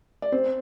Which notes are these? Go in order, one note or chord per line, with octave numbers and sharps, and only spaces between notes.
D5
C4 C5